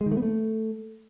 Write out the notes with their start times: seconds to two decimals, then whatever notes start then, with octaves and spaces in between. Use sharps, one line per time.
0.01 G#3
0.06 D#3
0.12 A3
0.17 B3
0.22 A3